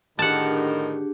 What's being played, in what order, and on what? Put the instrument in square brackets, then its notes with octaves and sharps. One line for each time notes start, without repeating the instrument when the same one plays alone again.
[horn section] A2 D3 D#3 [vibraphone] D4 G4 G#4 [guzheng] F#5 A5